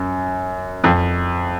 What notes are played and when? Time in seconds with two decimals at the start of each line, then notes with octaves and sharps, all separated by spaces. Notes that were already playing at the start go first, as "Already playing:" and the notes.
Already playing: F#2
0.84 F2